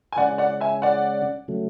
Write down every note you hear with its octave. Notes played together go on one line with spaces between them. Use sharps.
G#5
C#3 G#3 C#4 D5 F#5
D5 F#5
E5 G#5
D5 F#5
C#3 F#3 A3